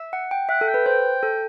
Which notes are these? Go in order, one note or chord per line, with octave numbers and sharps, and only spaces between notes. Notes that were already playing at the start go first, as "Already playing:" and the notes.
Already playing: E5
F#5
G5
E5 F#5
A4
G5
B4
C5
A4